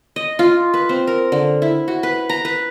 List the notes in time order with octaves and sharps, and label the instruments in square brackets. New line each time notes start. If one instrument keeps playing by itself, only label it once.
[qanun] D#5
F4
B4
C4
A#4
D3
E4
F#4
B4
A#5
B4